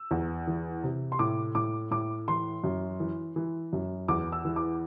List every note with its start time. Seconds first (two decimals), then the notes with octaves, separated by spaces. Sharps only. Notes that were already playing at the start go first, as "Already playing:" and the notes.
Already playing: E6
0.11 E2
0.47 E3
0.84 C3
1.12 C6
1.19 A2 D6
1.55 A2 D6
1.91 A2 D6
2.28 E3 C6
2.64 F#2
3.00 E3
3.36 E3
3.73 F#2
4.08 E2 D6
4.32 E6
4.45 E3
4.56 D6